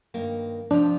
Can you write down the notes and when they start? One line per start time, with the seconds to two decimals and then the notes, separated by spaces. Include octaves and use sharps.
0.14 G2 D#3 A#3
0.71 C3 F3 C4 D4 F4